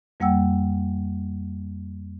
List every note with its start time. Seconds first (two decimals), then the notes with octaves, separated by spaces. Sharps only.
0.20 F2 G3 A#3 F#5 G5 E6